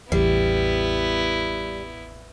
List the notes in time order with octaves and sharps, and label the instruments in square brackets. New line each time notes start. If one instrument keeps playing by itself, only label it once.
[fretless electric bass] A1 E2 [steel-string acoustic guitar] G3 [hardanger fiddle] B3 E4